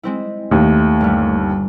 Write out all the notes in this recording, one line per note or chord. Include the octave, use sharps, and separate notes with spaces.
G#3 C4 E4
D#2 A3
G1 G3